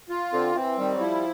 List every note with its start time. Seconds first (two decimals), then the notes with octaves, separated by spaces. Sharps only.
0.09 F4
0.33 D3 C4
0.55 E3 C4
0.78 D#3 G3
0.94 F#3
1.00 F3 E4